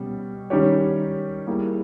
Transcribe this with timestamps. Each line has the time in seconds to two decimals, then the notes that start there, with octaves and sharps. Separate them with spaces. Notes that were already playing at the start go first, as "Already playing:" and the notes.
Already playing: B2 G3 C#4
0.50 D#3 G3 C#4 G4 C#5
1.47 G3 A#3 E4 G#4